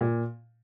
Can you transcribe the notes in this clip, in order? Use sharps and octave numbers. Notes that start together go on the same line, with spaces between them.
A#2